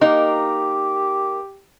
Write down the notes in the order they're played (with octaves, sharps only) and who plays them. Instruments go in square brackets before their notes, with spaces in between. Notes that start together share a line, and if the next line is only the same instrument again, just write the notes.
[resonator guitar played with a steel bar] A#3 D#4 A#4 [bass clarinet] G4